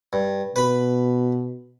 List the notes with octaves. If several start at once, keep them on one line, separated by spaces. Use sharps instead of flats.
G2
B2 B4 B5